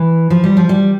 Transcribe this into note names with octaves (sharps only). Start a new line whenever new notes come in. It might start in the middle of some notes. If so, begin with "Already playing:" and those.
Already playing: E3
F3
G3
F3
G3